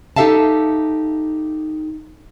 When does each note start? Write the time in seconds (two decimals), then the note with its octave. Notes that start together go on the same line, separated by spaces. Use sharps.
0.16 D#4 G4 A4 E5 F5 A5